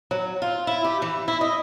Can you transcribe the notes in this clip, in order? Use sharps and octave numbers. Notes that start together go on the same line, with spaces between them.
F#3
F4
E4
G4
E3
E4
D#5